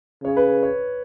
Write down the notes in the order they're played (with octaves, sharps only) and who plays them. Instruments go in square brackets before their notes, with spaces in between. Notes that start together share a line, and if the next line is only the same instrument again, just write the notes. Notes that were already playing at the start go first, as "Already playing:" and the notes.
[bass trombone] C#3 [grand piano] C#5
[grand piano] B4
C#5